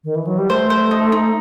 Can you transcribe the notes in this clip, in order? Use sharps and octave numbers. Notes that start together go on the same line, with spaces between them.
D#3
E3
F#3
G3
A3 C5
C5
D#4
D#4